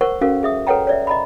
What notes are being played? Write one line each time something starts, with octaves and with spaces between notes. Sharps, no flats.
A#4 C5 F#5 C#6
C#4 F#4 A4 A#4 F5
G#4 E5 D#6
A4 B4 C#5 F#5 G5 A#5
C#5 D5 E5
D#5 A#5 B5